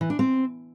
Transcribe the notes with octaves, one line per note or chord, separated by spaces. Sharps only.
E3
D4
C4